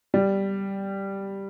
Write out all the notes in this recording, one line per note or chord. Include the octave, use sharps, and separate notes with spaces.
G3